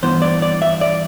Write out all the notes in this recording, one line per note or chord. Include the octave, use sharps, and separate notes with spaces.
G2 E3 B3 C5
D5
D5
E5
D5